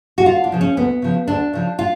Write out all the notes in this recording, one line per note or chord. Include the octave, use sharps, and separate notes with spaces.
F#4
D2 F4
D4
C#3 F3
C#4
D2 B3
C#3 F3
D2 D4
C#3 F3
F4